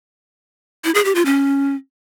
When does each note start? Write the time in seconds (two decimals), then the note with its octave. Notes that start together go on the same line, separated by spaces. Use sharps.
0.84 E4
0.95 G#4
1.05 G4
1.15 F4
1.25 C#4